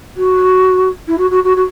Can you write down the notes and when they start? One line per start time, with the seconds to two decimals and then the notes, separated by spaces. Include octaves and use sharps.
0.16 F#4
1.07 E4
1.17 F#4
1.30 F#4
1.43 F#4
1.56 F#4